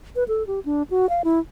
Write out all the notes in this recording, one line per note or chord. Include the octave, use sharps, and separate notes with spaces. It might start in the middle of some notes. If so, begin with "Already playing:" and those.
B4
A4
G4
D4
F#4
F5
E4